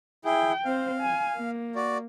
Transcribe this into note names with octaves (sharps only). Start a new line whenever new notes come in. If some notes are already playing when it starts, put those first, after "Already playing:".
E4 G#4 G5
C4 C5 F5
G#5
A#3
F#4 D5